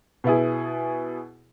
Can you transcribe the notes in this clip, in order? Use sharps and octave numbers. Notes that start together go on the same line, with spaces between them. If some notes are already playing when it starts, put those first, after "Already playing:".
B2 B3 E4 G#4